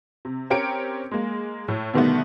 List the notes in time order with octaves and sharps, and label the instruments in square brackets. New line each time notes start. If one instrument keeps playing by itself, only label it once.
[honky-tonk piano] C3
C4 C#4 G4 A#4 C#7 D7
G#3 A#3
A2
B2 D3 D#3 G3 A3 B3